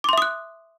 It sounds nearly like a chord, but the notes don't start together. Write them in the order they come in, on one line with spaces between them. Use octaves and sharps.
D6 C6 E5 D#6 F#6